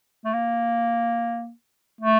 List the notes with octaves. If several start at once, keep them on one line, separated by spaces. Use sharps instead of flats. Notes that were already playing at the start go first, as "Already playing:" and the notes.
A3
A#3
A3